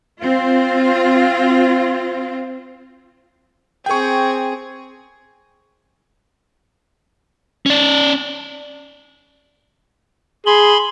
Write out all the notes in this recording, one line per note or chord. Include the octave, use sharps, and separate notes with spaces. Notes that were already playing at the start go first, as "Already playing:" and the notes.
C4 F4
C4 G#4 G5 C#6
C#4 D5
G#4 B5 C6